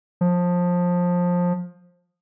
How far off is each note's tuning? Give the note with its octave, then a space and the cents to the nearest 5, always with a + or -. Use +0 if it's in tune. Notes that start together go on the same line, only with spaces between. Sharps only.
F3 +20